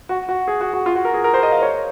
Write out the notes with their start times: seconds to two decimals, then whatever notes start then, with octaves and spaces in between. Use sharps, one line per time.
0.09 F#4
0.29 F#4
0.48 G#4
0.61 F#4
0.73 F#4
0.86 F4
0.95 F#4
1.05 A#4
1.14 G#4
1.24 A#4
1.34 C5
1.43 D#5
1.52 F5
1.62 C#5